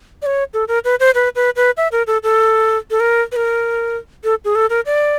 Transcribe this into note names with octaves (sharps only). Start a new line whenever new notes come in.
D5
C#5
A4
A#4
B4
C5
B4
B4
B4
E5
A#4
A4
A4
A4
A#4
B4
A#4
A4
G#4
A4
A#4
D5